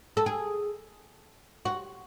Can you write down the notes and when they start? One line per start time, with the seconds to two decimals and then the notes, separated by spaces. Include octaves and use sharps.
0.17 A4
0.26 G#4
1.65 F#4